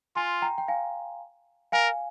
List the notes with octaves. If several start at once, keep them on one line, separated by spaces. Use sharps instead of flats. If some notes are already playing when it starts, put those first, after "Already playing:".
F4 G#5 C6
G5 A#5
G5
F5 G#5
A#4 F5 G#5